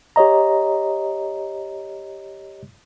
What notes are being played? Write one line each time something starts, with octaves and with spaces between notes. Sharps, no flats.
G4 C#5 D#5 A#5